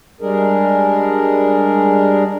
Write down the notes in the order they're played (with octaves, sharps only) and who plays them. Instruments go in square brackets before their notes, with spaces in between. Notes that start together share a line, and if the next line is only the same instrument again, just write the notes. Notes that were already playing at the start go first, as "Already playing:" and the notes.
[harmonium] G3 G#3 D4 G#4 A#4